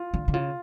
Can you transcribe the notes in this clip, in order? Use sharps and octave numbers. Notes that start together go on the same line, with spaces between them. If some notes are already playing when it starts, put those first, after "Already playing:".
Already playing: F4
D3
D3
C#3 F4